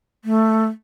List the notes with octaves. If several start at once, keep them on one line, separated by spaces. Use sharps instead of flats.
A3